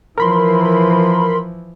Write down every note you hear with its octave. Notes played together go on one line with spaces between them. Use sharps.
E3 F3 A#4 B5 C6